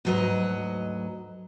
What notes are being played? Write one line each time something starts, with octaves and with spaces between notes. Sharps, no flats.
D2 G#2 F#3 B4 D#5